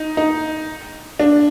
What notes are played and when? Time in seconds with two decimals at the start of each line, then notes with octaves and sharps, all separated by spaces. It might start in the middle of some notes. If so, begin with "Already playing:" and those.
Already playing: D#4
0.17 D#4
1.20 D4